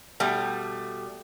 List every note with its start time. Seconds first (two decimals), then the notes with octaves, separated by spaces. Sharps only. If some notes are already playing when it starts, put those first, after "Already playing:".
0.20 B2 G3 A3